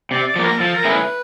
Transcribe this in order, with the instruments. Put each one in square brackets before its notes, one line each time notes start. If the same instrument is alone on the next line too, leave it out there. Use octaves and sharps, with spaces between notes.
[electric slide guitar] C3 [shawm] D5
[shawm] D5
[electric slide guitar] F3 A#3
[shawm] A#4
[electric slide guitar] F3 [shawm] A4
[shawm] A#4
[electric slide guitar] A3 C#4 E4 G#4
[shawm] B4